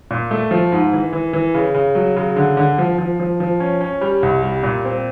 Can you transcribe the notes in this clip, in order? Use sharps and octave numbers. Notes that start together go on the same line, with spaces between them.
A#2
A3
F3
G#2
E3
E3
E3
C#3
C#3
F#3
C#3
D3
D3
F3
F3
F3
F3
C#4
C#4
G3
C2
G3
A#2
C4